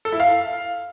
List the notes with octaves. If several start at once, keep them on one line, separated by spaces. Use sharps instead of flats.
A4
E4
F5